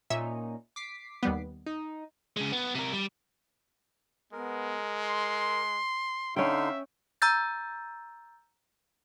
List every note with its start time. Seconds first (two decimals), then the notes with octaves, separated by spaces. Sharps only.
0.10 A#2 C#4 D#4 E5
0.76 D6 B6 C7
1.23 D#2 G3 B3
1.66 D#4
2.37 C#3 G#3
2.52 B3
2.75 C3 A#4
2.92 G3
4.33 G#3 B3 A#4
5.04 C6
6.36 D3 C#4 D#4 E5 F5 G5 C6
7.22 A#5 E6 G6 A6